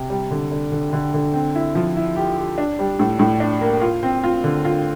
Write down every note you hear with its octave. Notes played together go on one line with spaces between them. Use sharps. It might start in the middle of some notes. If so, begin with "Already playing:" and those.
Already playing: C3
G3
D3
D3
D3
D3
D3
C4
E4
F3
E4
G4
G4
D4
G3
A2
A2
D4
A#3
F4
C4
F4
D3
F4